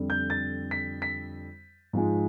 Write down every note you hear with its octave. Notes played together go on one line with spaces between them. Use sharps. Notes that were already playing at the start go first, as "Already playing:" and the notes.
Already playing: F2 D3 G3
G6
A6
B6
B6
G#2 F3 G#3